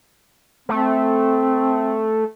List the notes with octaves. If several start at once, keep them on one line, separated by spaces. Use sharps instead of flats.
A3 C4